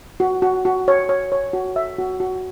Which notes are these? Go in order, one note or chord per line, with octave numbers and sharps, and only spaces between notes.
F#4
F#4
F#4
C#5
C#5
C#5
F#4
E5
F#4
F#4